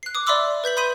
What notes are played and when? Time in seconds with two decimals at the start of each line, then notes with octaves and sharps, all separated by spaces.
0.03 F#6 C7
0.15 D6 D#6
0.27 D5 E5 B5 C6 D6 E6
0.64 B4 G6 B6 F#7
0.77 B5 C6 D#6 G6 B6 D#7